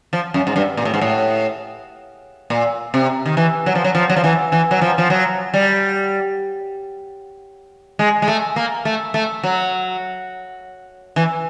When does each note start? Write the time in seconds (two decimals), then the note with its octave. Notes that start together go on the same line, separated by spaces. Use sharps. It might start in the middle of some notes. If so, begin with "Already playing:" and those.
0.13 F3
0.34 F#2
0.47 G#2
0.56 G2
0.77 A#2
0.85 A2
0.94 G#2
1.01 A2
2.50 A#2
2.94 C3
3.26 D#3
3.37 E3
3.66 F#3
3.75 F3
3.84 F#3
3.95 F3
4.10 F#3
4.16 F3
4.24 E3
4.52 E3
4.71 F#3
4.81 F3
4.98 F3
5.10 F#3
5.54 G3
7.99 G#3
8.22 G#3
8.28 A3
8.56 A#3
8.85 A3
9.14 A3
9.43 F#3
11.16 E3